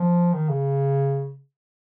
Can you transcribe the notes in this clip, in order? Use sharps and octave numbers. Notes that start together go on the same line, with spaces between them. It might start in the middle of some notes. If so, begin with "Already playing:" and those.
Already playing: F3
D#3
C#3